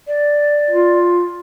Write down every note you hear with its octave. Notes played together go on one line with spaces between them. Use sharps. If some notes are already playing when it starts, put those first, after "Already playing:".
D5
F4